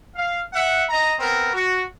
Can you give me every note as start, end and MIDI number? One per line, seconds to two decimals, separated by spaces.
0.15 0.41 77
0.53 0.83 76
0.53 0.83 78
0.89 1.13 75
0.89 1.13 82
1.19 1.51 59
1.19 1.51 60
1.19 1.51 70
1.53 1.82 66